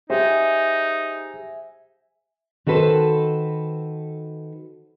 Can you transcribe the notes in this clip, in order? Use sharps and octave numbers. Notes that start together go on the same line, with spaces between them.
D#4 G4 G#4 C5 E5 F#5 G#5
D#3 F#4 A4 B4 C5